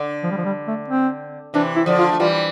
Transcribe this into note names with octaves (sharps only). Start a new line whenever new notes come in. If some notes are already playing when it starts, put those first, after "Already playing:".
Already playing: D3
F3
G3
F3
G3
A3
C4
C3 E3 D4
E4
D3 F3
F4
A3
E3 G3 F4